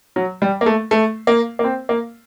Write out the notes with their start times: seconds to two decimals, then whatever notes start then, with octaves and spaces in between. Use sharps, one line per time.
0.16 F#3
0.42 G3
0.61 A#3
0.66 A3
0.91 A3
1.27 A#3
1.59 A#3
1.64 C4
1.89 A#3